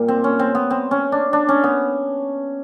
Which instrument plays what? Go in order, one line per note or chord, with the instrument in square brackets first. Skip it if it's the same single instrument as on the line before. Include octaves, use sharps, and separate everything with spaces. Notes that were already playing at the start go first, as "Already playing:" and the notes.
Already playing: [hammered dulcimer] A#2 G3
C4
C#4
C4
B3
C4
C#4
D4
D4
C#4
B3